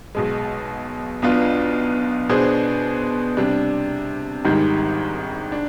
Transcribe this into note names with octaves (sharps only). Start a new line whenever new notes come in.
B1 B2 G#3
B1 B2 B3 D4 F4
B2 B3 D4 G#4 C5
C3 G3 D4
G#1 G#2 D#3 G3
D4